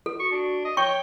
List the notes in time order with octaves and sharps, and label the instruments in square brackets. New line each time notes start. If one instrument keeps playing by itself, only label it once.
[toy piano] A4
[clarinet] F#4 [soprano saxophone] C#6
[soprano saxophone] D4
D#5
[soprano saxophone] C#5 [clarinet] G5 [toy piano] C#6